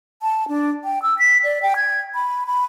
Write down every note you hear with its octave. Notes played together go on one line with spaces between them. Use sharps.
A5
D4
G5
E6
B6
D5
G5
G#6
B5
B5